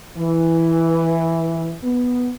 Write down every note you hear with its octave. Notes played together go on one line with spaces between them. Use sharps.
E3
B3